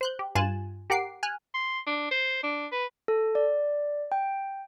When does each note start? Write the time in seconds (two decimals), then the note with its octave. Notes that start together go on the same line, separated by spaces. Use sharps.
0.01 C5 F#6 G6
0.19 G4
0.35 G2 F4 G#5 F#6 A6 E7
0.90 G4 A#4 F#5 D6 C7
1.23 G#5 F6 F#6
1.54 C6
1.87 D4
2.11 C5
2.43 D4
2.72 B4
3.08 A4
3.35 D5
4.12 G5